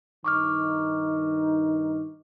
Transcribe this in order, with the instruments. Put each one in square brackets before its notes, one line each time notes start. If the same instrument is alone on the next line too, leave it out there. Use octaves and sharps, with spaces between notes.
[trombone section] G2 D#3 D#4 [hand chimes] C#6 D6 F6